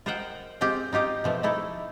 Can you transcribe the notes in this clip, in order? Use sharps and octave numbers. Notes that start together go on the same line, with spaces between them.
F4 A#4 C5 D#5 F#5 G5
G#3 C4 F4 G4
D#4 F4 G4 D#5
B2 F3 A3
A3 D#4 E4 A4